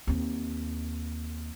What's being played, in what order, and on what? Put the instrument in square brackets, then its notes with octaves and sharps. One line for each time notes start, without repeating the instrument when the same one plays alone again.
[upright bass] D#2 C4